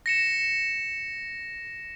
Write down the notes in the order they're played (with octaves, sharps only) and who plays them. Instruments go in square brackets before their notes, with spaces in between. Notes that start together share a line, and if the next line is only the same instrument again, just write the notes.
[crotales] A#6 C#7 E7